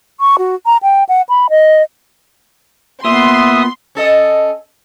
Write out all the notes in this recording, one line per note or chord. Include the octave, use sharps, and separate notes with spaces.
C#6
F#4
A#5
G5
F#5
B5
D#5
A#2 B3 E5 C6 D#6
C#4 A4 D#5